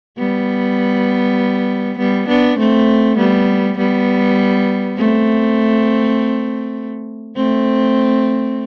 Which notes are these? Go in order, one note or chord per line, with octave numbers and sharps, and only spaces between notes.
G3 B3
G3 B3
B3 D4
A3 C4
G3 B3
G3 B3
A3 C4
A3 C4